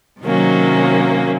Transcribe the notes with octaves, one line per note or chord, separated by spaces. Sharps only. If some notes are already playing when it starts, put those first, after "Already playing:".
C3 D#3 F#3 A#3 C#4